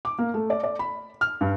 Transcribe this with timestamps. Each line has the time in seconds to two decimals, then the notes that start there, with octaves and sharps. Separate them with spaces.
0.05 D6
0.19 A#3
0.34 A3
0.50 D5
0.64 D5
0.79 B5
1.21 F6
1.41 G2